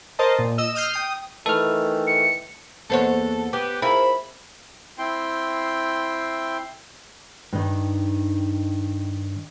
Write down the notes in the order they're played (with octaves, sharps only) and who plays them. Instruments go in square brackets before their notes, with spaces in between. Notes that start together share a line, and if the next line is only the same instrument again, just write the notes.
[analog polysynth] A#4 C5 D#5 A5
A#2
D#5 E6
D#6 F6 G6 C7
G5 D#6
[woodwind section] D#3 E3 A3 [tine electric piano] A4 F6
[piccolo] C#7
[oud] E2 C5 C#5 [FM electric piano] A#3 B3 F#5 [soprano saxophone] A4
[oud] B3 [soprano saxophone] G4 [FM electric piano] D6
[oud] C4 E4 F4 [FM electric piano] G#4 A#4 [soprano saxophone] B5
[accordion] C4 E4 G5 C6
[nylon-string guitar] G2 D#3